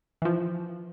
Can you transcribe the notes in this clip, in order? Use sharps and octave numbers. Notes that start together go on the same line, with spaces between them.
E3 F3